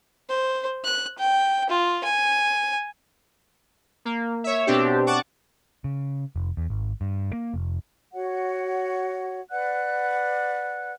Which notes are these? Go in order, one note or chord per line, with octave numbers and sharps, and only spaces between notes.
C5
F#6
G5
F4
G#5
A#3
C#5 E5
B2 C4 D4 G4
F#5 A5 C#6 D6
C#3
F1
E2
G#1
G2
A#3
F1
F#4 C#5 F#5
B4 D5 F#5 F#6